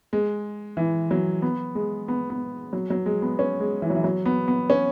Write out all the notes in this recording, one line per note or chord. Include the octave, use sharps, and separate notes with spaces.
G#3
E3
F#3
B3
G#3
B3
B3
F#3
F#3
G#3
B3
C#4
G#3
E3
F#3
E3
F#3
B3
B3
C#4